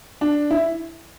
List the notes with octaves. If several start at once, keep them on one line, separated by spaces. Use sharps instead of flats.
D4
E4